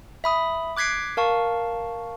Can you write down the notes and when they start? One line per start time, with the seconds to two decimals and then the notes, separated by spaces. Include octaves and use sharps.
0.24 E5 B5 D#6
0.77 D6 F#6 G#6 B6 C7 D7
1.17 A#4 F5 A5 C#6